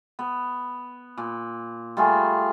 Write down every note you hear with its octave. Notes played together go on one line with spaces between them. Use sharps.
B3
A#2
G3 A3 F4 G#4